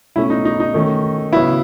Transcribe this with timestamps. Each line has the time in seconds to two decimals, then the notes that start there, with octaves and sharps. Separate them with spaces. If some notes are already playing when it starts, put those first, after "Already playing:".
0.16 B2 A3 C#4 E4
0.30 D#4
0.45 D#4
0.60 D#4
0.74 D#3 A3 C#4
1.32 C#3 F#3 B3 E4